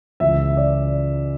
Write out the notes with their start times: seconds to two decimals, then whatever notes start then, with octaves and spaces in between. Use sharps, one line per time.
0.20 C#2 C#3 E3 E5
0.57 D5